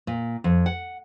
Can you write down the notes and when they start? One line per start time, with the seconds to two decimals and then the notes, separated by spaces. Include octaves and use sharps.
0.07 A#2
0.44 F2
0.66 F#5